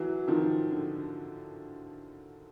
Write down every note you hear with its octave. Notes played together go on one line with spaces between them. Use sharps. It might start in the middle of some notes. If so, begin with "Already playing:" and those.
Already playing: E3 F#3
D#3 F3
D3